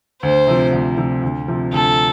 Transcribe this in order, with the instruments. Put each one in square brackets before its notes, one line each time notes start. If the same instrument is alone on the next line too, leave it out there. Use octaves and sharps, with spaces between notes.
[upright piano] D2 [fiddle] C5
[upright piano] C3 F3
D2
C3 F3
D2
C3 F3
[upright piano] D2 [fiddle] A4